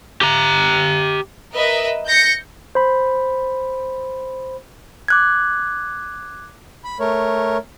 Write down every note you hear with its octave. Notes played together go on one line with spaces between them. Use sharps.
G4 A#5
A#4 B4 D#5 E5
G6 A#6 C#7
C5 B5
D6 F#6 G#6
B5
A3 A#4 C#5